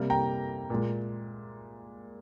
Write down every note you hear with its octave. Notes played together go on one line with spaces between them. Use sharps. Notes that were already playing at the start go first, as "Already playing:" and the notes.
Already playing: C3 G3 A#3
G5 A#5
A#2 G#3